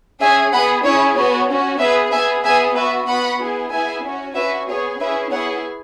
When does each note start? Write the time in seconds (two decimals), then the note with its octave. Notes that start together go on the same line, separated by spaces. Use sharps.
0.21 C#4 G#4 E5 G#5
0.52 B3 G#4 F#5 B5
0.84 C#4 E4 G#4 C#5
1.16 B3 F#4 C#5
1.48 C#4 F#4
1.79 B3 G#4 B4 E5
2.12 B3 G#4 E5 G#5
2.43 B3 G#4 E5 G#5
2.75 B3 F#4 B4 E5
3.07 B3 F#4 F#5 B5
3.39 B3 E4 G#4
3.71 B3 E4 G#4 E5 G#5
4.03 C#4 F#4
4.35 C#4 F#4 B4 E5
4.67 B3 G#4 C#5
4.99 C#4 E4 G#4 B4 E5
5.30 B3 E4 G#4 C#5 F#5